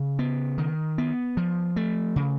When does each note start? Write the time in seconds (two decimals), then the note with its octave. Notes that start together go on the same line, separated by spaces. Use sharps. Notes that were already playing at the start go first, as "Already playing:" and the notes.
Already playing: C#3
0.19 B3
0.58 D#3
0.98 B3
1.37 F3
1.76 A3
2.16 C#3